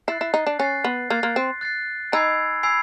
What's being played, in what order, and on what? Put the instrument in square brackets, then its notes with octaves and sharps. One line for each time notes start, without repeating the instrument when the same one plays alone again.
[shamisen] E4 [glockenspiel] F#6 A6 C7
[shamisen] E4
D#4
D4
[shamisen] C#4 [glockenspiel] F#6 A6 C7
[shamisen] B3
[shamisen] A#3 [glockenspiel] F#6 A6 C7
[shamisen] A#3
C4
[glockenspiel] F#6 A6 C7
[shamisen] D#4 [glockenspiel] G#5 B5 E6 G#6 C7
[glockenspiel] G#5 B5 E6 G#6 C7